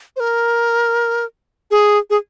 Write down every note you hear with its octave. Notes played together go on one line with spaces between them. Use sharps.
C5
A#4
G#4
G#4